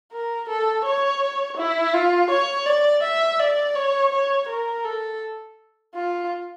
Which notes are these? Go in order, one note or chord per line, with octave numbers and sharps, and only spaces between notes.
A#4
A4
C#5
E4
F4
C#5
D5
E5
D5
C#5
C#5
A#4
A4
F4